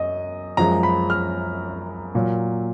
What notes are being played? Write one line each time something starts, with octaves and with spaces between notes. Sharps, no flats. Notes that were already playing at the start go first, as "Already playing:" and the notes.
Already playing: F#2 D#5
F#2 F3 G#3 A#5
B5
F6
A#2 F#3